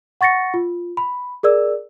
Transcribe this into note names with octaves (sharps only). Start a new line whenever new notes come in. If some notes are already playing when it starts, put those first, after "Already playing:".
F#5 C#6 A6 A#6 C#7
F4
B5
G#4 A#4 D5 E6